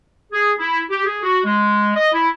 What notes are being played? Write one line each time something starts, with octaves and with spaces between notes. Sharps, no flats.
G#4
E4
G4
G#4
F#4
G#3
D#5
E4